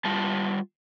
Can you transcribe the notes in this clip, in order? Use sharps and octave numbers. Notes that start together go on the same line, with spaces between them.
G3 F4 A5